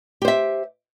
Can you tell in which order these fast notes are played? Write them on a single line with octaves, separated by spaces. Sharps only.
G4 C5 E5